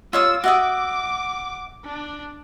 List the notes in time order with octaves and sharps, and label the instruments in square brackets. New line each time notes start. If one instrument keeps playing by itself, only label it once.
[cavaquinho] F4 C#5 D#6 [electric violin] E6
[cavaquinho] F#4 E5 D#6 [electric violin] D6
[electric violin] D4